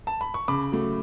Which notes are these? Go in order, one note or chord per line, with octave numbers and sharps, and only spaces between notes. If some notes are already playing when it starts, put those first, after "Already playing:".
A5
B5
C#6
C#3 B5 D6
F#3 A3